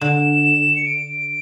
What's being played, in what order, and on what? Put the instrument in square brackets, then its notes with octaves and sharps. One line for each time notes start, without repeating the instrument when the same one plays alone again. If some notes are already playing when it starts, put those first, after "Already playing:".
[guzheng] D3 [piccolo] E7
[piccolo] C#7
D7